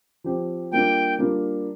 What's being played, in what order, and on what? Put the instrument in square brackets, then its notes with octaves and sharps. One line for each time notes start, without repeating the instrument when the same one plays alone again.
[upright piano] F3 C4 G4
[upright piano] G3 A#3 D4 F4 [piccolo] G5
[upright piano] G3 A#3 D4 F4